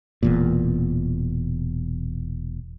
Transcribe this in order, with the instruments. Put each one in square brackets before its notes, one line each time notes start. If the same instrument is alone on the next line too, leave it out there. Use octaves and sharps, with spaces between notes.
[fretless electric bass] E1 E2 A#2